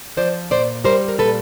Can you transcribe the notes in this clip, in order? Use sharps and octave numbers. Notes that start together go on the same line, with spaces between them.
F3 C5 D5
A#2 C5 D5
G3 A#4 C5
A#4
A#2 A4 B4